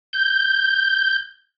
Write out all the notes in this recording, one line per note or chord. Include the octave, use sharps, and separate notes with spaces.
G6